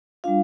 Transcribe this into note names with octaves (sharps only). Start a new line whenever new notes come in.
G3 D4 F4 F5